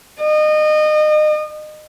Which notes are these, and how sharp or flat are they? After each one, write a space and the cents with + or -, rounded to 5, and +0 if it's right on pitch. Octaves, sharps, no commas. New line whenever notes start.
D#5 -30